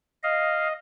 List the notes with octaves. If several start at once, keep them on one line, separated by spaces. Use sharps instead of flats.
D#5 F5